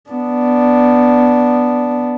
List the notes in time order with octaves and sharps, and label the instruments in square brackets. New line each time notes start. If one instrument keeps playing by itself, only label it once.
[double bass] B3 D4